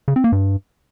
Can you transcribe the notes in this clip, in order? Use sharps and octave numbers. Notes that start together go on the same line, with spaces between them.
C#3
C4
A#3
G2